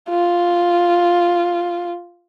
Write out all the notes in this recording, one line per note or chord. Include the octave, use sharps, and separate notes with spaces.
F4